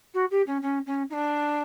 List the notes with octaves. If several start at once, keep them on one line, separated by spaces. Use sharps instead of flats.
F#4
G4
C#4
C#4
C#4
D#4
D4